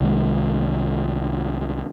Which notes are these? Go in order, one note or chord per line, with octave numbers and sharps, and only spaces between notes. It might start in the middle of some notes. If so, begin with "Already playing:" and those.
C2 D#3 F#3 G#3